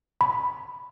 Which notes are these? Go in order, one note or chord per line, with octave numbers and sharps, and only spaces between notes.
B5